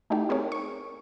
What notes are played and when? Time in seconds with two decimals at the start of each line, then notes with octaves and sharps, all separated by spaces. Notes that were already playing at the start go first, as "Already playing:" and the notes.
0.10 A3 D#4 E4 F#4 G4 A4
0.29 C4 G#4 A#4 C#5
0.52 C#6